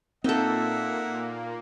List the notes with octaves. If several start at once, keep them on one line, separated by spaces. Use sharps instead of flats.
A#2 A#3 C4 D#4 A4 E5 F#5